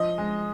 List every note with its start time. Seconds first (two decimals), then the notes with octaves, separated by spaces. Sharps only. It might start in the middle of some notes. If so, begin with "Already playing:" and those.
Already playing: F3 D#5
0.18 G#3